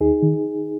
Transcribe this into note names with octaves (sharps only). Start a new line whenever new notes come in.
D#2 D#4 G#4
D#3